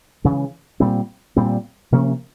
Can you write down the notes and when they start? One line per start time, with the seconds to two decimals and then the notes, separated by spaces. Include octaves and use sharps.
0.24 C#3 E3 G#3
0.80 A#2 G3 C4
1.36 A#2 G3 C4
1.92 C3 F3 A#3 C#4